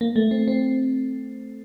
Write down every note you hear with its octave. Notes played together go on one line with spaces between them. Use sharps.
A#3
A3
C4
C4